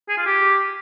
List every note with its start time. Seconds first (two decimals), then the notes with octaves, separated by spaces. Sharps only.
0.09 G#4
0.17 F4
0.26 G4